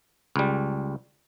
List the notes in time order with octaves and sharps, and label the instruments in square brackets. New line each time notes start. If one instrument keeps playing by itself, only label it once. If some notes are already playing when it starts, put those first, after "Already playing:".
[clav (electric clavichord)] C#2 G3